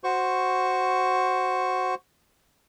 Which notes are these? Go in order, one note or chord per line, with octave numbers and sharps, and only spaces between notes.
F#4 C5 C#6